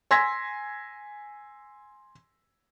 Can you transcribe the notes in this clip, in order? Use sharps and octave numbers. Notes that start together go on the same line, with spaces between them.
G#5 C6 E6 G#6 A#6 B6